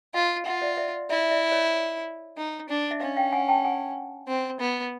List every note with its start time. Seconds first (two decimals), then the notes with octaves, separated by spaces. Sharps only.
0.14 F4 D#5 F5
0.46 F4 E5 F#5
0.62 D5 E5
0.77 D5 E5
1.09 E4 D5 E5
1.31 D5 E5
1.52 C#5 D#5
2.38 D#4
2.69 D4
2.91 E5
3.00 C#4 D#5 F5
3.17 F5 G5
3.32 F#5 G#5
3.48 G5 A5
3.65 F#5 G#5
4.28 C4
4.60 B3